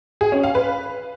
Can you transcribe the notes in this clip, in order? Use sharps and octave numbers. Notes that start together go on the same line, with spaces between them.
G#4
C#4
F5
B4